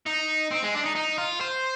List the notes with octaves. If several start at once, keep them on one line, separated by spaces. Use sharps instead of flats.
D#4
C4
G#3
D4
D#4
D#4
F4
C5